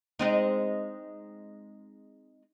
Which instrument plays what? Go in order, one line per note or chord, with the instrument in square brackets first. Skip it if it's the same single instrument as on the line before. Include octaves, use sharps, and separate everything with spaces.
[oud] G#3 C4 D#4